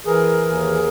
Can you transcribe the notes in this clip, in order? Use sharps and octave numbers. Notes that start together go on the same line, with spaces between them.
E3 G#4 A#4
D#2